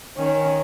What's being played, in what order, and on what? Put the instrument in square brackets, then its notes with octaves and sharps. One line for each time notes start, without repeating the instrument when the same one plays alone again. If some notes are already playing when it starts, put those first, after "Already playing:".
[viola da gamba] D#3 [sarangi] C#4